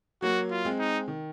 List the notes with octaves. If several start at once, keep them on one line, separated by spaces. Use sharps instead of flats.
F#3 A#3 F#4
F4
G#3 C4
D#4
D#3